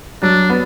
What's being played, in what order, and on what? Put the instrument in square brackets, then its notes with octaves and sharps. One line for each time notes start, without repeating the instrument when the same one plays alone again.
[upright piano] F#3 [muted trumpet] D4
[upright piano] B3